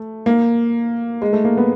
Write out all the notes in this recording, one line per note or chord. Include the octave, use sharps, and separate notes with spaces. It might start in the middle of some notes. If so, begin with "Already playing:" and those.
Already playing: A3
A#3
G#3
A3
A#3
B3